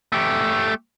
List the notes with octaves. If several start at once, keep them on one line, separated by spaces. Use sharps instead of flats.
A3 G4